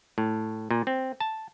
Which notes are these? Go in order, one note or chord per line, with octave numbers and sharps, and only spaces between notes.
A2
A#2
C4
A5